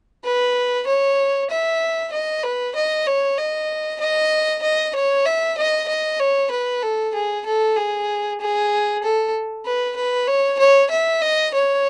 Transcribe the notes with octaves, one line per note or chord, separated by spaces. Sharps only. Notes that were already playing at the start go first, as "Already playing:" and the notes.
B4
C#5
E5
D#5
B4
D#5
C#5
D#5
D#5
D#5
C#5
E5
D#5
D#5
C#5
B4
A4
G#4
A4
G#4
G#4
A4
B4
B4
C#5
C#5
E5
D#5
C#5